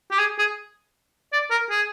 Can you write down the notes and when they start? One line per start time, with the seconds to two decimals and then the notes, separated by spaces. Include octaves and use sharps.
0.11 G4
0.19 G#4
0.39 G#4
1.33 D5
1.51 A#4
1.70 G#4